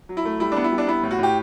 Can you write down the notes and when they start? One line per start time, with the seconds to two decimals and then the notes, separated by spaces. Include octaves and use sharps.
0.09 F#3
0.17 E4
0.25 A3
0.40 G3 E4
0.52 B3 D4
0.64 E4
0.72 G3
0.78 D4
0.87 B3 E4
1.03 A2
1.11 F#4
1.19 A2 G4